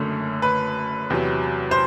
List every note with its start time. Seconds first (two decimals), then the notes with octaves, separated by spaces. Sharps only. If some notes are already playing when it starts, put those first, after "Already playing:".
Already playing: F#1 F#2 D3 A3
0.42 B4
1.10 E2 C3 F#3
1.71 C5